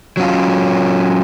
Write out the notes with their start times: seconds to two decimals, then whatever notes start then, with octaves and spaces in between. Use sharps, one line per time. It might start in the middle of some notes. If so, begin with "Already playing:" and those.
0.17 F#3 C#4 F4